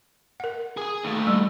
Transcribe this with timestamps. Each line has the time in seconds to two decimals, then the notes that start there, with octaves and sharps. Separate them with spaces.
0.40 A#4 F#5
0.77 G#4 G#5
1.04 D#2 A3
1.27 G3